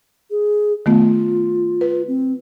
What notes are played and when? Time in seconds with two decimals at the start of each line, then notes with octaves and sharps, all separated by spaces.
0.31 G#4
0.86 D#3 A3 B3 F4
1.81 B4
2.08 C4